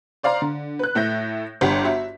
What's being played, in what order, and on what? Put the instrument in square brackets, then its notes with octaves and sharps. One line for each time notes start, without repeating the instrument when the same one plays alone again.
[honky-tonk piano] C5 D5 F5 A#5 C6
D3
B4 F#6
A2 A3 E5 G6 A#6
G1 G2 G4 F#5 B6
F#4 E5